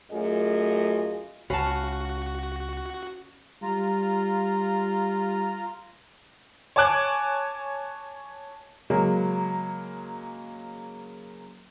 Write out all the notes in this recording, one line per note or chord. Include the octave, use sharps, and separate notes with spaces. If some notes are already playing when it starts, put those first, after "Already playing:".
F#2 A3 F4 G#4 D#5
C#2 C#4 F#4 F5 A5 B5
G3 F4 A#5
C#5 G#5 A5 D6 F#6 G#6
C#3 F#3 G#3 A#3